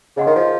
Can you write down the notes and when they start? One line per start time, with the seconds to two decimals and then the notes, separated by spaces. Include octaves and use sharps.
0.16 C#3 G#4 D#5 F#5 C6
0.27 D#3
0.35 F3